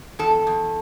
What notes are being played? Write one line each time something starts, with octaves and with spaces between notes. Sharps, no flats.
E2 A4
E2